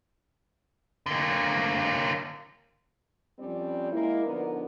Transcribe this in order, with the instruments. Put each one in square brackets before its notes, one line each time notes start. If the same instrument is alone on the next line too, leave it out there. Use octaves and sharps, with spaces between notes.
[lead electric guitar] D3 A#3
[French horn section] F2 F3 G3 C4 C#4 D5
G#3 A#3 E4
D3 F3 B3 D4 D#4 A#4